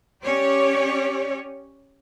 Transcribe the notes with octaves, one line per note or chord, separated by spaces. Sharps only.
C#4 G4 C#5 D5